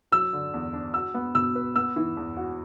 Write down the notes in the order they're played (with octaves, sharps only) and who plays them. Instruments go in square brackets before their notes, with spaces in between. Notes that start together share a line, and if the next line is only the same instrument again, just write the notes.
[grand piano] F#3 [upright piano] E6
[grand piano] D3
E2
D4
[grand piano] F#4 [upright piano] E6
[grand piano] B3
[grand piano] B2 [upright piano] E6
[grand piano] B4
[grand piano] B3 [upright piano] E6
[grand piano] E3
E2
F#4